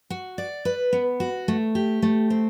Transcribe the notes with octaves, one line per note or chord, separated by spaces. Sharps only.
F#4
D5
B4
B3
F#4
A3
G4
A3
C4